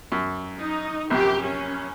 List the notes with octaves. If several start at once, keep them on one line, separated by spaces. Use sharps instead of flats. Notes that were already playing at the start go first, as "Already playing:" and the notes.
F#2
D#4
A#1 F#2 C3 G4
C#4